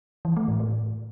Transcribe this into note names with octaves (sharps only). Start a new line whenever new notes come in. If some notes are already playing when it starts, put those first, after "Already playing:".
E3
A3
A2
A2